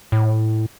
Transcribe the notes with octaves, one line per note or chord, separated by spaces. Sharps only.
A2